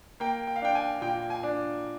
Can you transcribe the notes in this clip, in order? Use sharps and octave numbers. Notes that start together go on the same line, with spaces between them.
A#3 G5
G5
F5
D4 G5
G#5
A#2 G5
G#5
D4